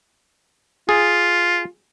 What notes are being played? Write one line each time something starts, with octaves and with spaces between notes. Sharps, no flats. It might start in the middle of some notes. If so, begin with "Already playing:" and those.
F4 G#4